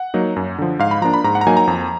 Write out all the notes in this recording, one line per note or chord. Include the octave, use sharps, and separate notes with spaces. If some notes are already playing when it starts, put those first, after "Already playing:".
Already playing: F#5
F#3 A#3 D#4
F#2
D3 F3
G#2 F5
B5
F3 A#3 D4 A#5
B5
G#2 A#5
F#5
A#5
F#3 A#3 D#4 G#5
A#5
F2